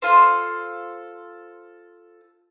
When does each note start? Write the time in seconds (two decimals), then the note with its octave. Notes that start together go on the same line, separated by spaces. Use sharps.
0.02 F4 A4 C5